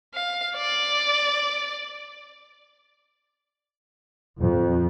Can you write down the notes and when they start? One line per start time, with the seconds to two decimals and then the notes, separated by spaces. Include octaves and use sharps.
0.14 F5
0.56 D5
4.39 F2